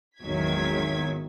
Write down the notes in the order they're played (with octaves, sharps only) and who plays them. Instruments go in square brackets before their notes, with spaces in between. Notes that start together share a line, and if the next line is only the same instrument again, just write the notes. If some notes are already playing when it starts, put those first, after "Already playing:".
[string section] G#1 E2 D#3 F#3 G#6 B6